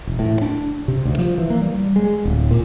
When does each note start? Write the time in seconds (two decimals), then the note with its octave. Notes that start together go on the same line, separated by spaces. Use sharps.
0.07 E1
0.19 A2
0.42 D4
0.88 C3
1.05 D2
1.18 F3
1.38 E3
1.50 A#3
1.62 G3
1.96 G#3
2.25 D1
2.51 A#2